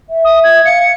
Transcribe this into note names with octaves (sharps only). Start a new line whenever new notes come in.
E5
D#6
G#6
F5 C#7